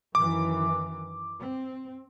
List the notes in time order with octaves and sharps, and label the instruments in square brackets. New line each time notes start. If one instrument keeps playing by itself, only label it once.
[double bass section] F#2 D#3 E3 [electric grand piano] D6
[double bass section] C4